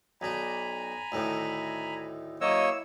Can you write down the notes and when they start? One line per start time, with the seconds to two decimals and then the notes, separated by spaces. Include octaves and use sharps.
0.21 B1 D4 G#5 A#5 B5
1.12 D2 A2 D#3
2.41 F#3 A#3 E4 C#5 D#5 E6